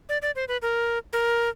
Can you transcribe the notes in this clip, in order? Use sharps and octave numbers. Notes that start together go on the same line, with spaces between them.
D5
D5
C5
B4
A#4
A#4